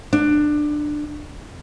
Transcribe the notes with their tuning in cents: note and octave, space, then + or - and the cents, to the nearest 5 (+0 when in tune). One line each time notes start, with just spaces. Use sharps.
D4 +20